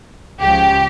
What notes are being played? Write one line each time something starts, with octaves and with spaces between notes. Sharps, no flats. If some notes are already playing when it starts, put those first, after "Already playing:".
C#2 C#3 F3 G4